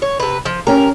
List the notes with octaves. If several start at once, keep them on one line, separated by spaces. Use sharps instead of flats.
C#5
C3 B4
F3
C#4 G4 A#4